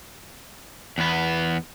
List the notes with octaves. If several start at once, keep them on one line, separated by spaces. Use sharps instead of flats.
E2 B3